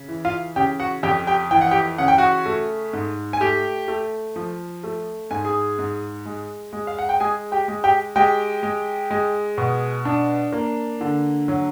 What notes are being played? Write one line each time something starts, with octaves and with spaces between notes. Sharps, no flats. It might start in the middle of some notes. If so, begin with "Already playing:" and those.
Already playing: C#3
E3
F4 F5
C#3 G4 G5
F#4 F#5
F2 G4 G5
G4 G5
E3 G5
F#5
G4 G5
C#3 F#5
G5
F#4 F#5
A3
G#2
G#5
A3 G4 G5
A3
F3
A3
G#2 G#5
G#4 G#5
G#2
G#3
G#3
F5
F#5
G5
G#3 G#4 G#5
G4 G5
G#3
G4 G5
G#3 G4 G5
G#3
G#3
B2
D4
A#3
D3
F#3